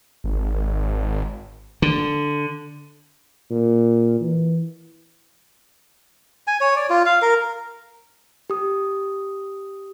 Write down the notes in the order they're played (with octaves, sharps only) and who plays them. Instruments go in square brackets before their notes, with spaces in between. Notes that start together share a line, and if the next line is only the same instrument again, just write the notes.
[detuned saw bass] G#1
[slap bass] D3
[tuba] A#2
E3
[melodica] G#5
C#5
D5
F4
F5
A#4
[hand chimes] G4 D#6